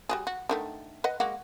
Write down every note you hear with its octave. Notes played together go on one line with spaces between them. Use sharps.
G3 F#4 G#4
F#4
D3 D#3 A3
B4 D#5 F#5
G#3 A#3 F#4